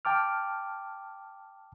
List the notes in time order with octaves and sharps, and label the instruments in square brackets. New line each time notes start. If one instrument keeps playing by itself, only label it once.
[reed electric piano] G5 A5 D6 F6